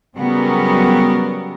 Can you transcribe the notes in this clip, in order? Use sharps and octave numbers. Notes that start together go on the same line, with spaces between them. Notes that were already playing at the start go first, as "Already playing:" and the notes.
C#3 F#3 G3 B3 A#4